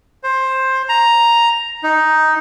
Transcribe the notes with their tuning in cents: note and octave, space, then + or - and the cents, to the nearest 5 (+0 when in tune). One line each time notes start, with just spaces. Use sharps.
C5 +15
A#5 +5
D#4 +5